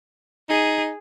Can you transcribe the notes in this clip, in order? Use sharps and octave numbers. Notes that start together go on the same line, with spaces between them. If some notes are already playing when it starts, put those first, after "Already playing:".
D#4 G#4